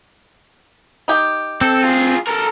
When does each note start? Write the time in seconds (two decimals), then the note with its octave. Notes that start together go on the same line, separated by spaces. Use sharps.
1.08 D#4 G4
1.61 C4 A4
1.83 F4 G#4
2.27 A4 A#4